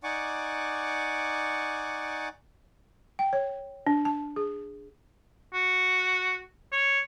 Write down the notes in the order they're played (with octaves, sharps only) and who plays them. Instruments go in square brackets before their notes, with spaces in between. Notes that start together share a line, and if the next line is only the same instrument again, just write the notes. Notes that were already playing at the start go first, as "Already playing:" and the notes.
[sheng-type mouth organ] D#4 D5 F#5 G#5 C#6 D6
[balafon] G5
C#5
D4
A5
G#4
[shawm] F#4
C#5